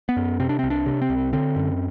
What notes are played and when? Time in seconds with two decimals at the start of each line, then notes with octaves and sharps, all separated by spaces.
0.09 B3
0.17 F#2
0.40 C3 C4
0.49 D4
0.59 C2 C4
0.70 D4
0.86 C3
1.02 C4
1.09 C2
1.33 D3 C4
1.56 F#2